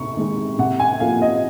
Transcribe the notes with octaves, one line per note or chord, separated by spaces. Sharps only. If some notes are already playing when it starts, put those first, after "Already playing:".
Already playing: C3 C#6
D#3 G#3
C3 F#5
G#5
F3 A#3 F5
D#5